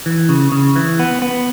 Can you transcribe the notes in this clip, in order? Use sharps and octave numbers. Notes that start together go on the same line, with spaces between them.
E3
C#3
C#3
E3
B3
B3